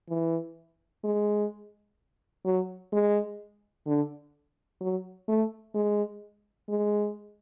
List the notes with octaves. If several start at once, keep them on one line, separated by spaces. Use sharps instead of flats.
E3
G#3
F#3
G#3
D3
F#3
A3
G#3
G#3